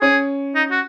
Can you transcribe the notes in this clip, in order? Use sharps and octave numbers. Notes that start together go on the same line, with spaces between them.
C#4 G#4
D#4
F#4